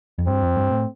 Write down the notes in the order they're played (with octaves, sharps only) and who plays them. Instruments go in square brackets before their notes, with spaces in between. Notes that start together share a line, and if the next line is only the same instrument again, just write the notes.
[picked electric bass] F2
[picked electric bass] G2 [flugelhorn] C4
[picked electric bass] F2
G2
A2